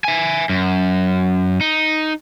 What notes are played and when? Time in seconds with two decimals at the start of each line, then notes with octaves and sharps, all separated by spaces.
0.04 E5 G#5
0.49 F#2
1.61 D#4